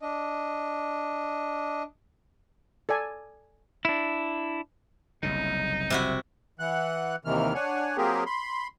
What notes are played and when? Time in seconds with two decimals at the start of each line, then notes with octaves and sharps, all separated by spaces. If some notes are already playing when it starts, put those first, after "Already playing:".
0.02 D4 D#5
2.89 A4 D5 G#5
3.85 D4 E4
5.23 F#1 C2 C#3 D#4
5.90 C3 E4 F#4
6.59 E3 F#5 F#6
7.25 D#2 C3 D#3 E3 F6
7.55 D4 C#5 F#5 G#5
7.97 F#3 A#3 C4 G4 G#4 A#4
8.26 B5 C6